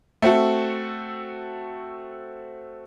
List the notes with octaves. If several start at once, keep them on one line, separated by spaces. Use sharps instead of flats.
A3 C4 F#4 A4